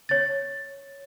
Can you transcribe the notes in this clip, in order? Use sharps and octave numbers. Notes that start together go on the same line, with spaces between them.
C#5 A6